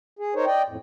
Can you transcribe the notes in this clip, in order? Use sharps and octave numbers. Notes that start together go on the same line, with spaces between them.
G#4
D#4 A#4 C5 C#5
D5 D#5 G5
F2 A2